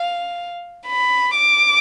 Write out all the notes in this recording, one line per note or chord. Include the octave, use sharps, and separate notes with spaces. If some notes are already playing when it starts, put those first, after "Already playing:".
Already playing: F5
B5
D6